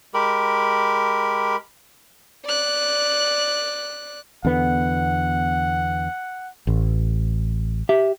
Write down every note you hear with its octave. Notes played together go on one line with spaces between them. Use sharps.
G#3 G4 A#4 B5
D5 F#6
E2 D3 B3 F#5
A1
G4 E5